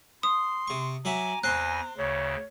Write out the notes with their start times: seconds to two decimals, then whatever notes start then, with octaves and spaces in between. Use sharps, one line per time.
0.23 C6 D#6
0.68 C3 C#6
1.05 F#3 F#4 E5 G#5 A#5 D6
1.43 E2 C4 C5 G#5 C6 F#6 A#6
1.97 D2 C#3 C#5